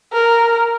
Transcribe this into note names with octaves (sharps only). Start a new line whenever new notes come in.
A#4